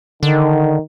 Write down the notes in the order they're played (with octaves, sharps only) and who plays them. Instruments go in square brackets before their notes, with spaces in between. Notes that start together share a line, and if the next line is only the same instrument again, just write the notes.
[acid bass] D3 [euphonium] D#3